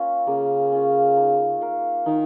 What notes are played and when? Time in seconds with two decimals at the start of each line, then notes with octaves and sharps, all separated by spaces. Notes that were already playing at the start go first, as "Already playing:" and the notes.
Already playing: A#3 C#4 F4
0.27 C#3 A#3
0.72 C#4 F4
1.16 D#4
1.61 A#4 F5
2.06 D#3 D#4